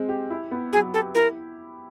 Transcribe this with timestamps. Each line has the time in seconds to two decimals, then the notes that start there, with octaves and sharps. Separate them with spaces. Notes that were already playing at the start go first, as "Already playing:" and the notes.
Already playing: G#3 C4
0.09 G4
0.30 E4
0.51 B3
0.73 F#3 G#4
0.94 G4 A4
1.15 E4 A#4